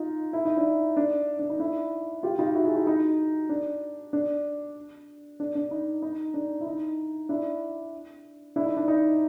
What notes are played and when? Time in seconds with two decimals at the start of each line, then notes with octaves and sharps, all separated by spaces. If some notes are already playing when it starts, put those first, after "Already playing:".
Already playing: D#4 F4
0.33 E4
0.45 D#4
0.57 D4 E4
0.97 D4
1.39 D4
1.50 D#4
1.59 D4 E4
2.23 F4 G4
2.39 D#4 F4
2.55 E4 F#4
2.65 F#4 G#4
2.75 E4 F#4
2.87 D#4
3.49 D4
4.13 D4
5.40 D4
5.55 D4
5.71 D#4
6.02 D#4
6.34 D4
6.61 E4
6.67 D#4
7.29 D4 E4
8.56 D4 E4
8.66 D#4
8.77 D4
8.88 D#4